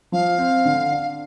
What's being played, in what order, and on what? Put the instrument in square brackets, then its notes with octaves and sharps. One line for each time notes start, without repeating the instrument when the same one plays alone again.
[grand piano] F3 [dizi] F5
[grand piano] C4
D3
D4